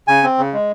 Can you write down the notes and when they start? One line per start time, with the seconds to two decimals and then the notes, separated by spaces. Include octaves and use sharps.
0.08 C#3 G#5
0.23 C4
0.38 C#3
0.53 G#3